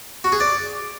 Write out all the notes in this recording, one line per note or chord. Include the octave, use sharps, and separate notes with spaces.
F#4
G#4
D5